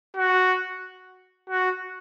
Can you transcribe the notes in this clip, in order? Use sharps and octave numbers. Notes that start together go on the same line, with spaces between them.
F#4
F#4